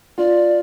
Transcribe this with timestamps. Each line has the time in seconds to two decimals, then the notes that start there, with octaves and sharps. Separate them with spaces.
0.18 F4 D5